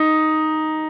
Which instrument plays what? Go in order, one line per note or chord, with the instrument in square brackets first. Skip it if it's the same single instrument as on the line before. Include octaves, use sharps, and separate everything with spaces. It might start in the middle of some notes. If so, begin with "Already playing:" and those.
Already playing: [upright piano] D#4